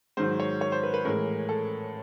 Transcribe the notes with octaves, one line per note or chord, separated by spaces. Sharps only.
G#2 D#3 F#3 C5
C#5
C#5
C5
B4
B4
A2 E3 G#3 A#4
A4